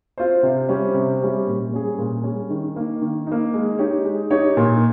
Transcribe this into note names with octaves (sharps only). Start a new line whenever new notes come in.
C4 F4 C5
C3
G3 C#4 G4 C5
C3
G3 C#4 G4 C5
A#2
G3 C#4 G#4
A#2
G3 C#4 G#4
D#3
A#3 D#4
D#3
A#3 D#4
G#3
D#4 G4 C#5
G#3
D#4 G4 C#5
A#2